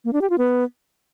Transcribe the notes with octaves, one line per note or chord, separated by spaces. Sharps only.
A#3
D4
G4
F4
B3